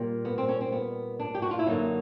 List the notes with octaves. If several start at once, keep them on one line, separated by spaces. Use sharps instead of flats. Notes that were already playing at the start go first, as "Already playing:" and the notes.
Already playing: A#2 G3
B3
C4
C#4
C4
B3
D4
G4
F#4
F4
E4
F#2 D3 F#3 A#3 D#4